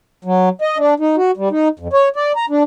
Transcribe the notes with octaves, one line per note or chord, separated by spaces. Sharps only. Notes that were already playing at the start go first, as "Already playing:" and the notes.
F#3
D#5
D4
D#4
F#4
G3
D#4
F2
C#5
D5
A#5
D4